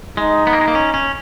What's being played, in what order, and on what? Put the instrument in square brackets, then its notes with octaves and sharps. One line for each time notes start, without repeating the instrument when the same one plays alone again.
[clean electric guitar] G#3 [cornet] D#4
[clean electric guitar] B3
A#3
G#3
A#3
C#4
C#4